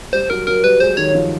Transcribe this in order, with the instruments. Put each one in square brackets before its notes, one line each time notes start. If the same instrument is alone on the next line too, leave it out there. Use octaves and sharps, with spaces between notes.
[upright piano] G3 [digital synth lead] C5
[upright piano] F#3 [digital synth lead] A#4
[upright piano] F#3 [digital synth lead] A#4
[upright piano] G3 [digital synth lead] B4
[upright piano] G#3 [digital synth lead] C5
[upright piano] D#3 [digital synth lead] C#5
[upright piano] F3